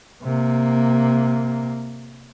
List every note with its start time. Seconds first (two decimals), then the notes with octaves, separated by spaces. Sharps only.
0.23 C3 A#3